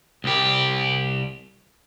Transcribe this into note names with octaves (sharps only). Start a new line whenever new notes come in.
C2 G4